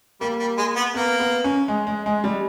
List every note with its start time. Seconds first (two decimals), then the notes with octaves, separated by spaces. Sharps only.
0.21 G3 A#3
0.40 G3
0.58 G#3
0.76 B3
0.94 A#3 B3
1.20 B3
1.44 C#4
1.68 G#3
1.87 G#3
2.06 G#3
2.24 G3